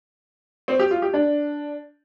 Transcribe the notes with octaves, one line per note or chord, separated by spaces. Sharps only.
C4
G4
F4
G4
D4